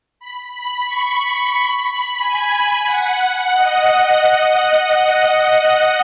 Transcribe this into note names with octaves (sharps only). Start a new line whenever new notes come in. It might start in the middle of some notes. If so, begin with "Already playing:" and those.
B5
B5
C#6
B5
B5
G#5
F#5
D#5